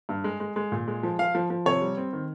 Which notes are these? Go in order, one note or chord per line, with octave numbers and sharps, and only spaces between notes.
G2
G#3
G#3
G#3
A#2
G#3
F3
F3 F5
F3
F3
C3 C#5
G3
C4
D#3